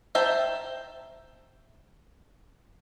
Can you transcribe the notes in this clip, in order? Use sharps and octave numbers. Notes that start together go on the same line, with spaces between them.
C5 E5 G5 A5 A#5